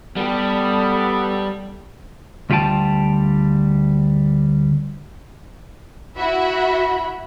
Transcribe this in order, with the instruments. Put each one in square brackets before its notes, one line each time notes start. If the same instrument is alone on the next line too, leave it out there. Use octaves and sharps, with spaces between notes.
[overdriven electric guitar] G3 G4 [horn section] B3 A4
[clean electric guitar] D2 G3 F4 G5 A5
[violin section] E4 F#4 E5 B5